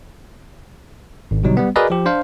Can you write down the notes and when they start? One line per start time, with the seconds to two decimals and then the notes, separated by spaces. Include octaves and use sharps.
1.31 G#1
1.43 B2 D3 F#3 G3 D#4
1.57 G3 B3
1.76 F#4 G#4 A#4 B4 D5 D#5
1.90 F3 G4
2.06 D4 C5 F5